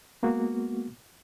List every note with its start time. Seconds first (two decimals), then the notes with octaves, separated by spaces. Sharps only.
0.23 G#3 A#3 B3 F#4